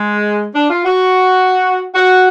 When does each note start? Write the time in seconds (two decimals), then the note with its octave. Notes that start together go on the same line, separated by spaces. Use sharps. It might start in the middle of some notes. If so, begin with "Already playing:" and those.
Already playing: G#3
0.55 D4
0.70 F4
0.85 F#4
1.95 F#4